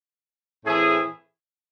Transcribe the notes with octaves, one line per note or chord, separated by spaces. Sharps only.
A2 E3 C4 E4 G#4